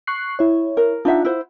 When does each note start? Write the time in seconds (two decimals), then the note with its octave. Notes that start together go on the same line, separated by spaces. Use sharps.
0.07 C#6 F#6 C7
0.39 E4 C#5
0.77 A#4
1.05 D4 D#4 F4 E5 F#5
1.25 E4 C5